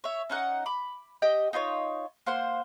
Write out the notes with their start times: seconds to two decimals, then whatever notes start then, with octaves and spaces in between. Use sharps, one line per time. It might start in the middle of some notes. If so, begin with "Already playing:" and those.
0.04 C#5 E5
0.30 C#4 D#4 F#5
0.66 B5 D6
1.22 G4 D#5 G5
1.53 D#4 F4 B4 C#5
2.26 A#3 C5 F#5 C6